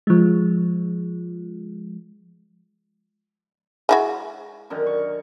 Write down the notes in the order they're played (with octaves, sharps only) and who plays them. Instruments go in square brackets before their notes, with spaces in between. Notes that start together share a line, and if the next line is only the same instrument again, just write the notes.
[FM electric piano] F3 G#3
[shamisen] G#3 E4 F#4
[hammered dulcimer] F#2 D3 D#3
C#6